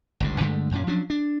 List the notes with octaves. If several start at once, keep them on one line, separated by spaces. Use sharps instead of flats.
G1 C#2 G2
G2 D3 G#3 A3
F#2 A#2 C#4
F3 F#3 C#4 D4
D4